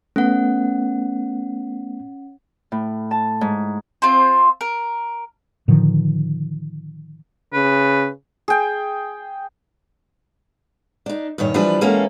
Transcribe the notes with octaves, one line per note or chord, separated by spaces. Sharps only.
A3 B3 C#4 F#5
A2
A5
G#2
C4 F4 C5
A#4
A2 D3 D#3 F3
C#3 B4
G#4 G5
D4 D#4
G2 A#2 D#3 C#5
E3 F3 G3 D4 B4
E3 G#3 A#3 B3 C#4 A4